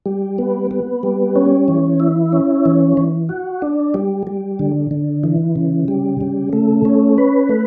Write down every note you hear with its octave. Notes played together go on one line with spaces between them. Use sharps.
G3
B3
B3
G3
C#4
E3
E4
C#4
E3
E3
F#4
D4
G3
G3
D3
D3
E3
C#3
G3
C#3
A3
C#4
B4
A3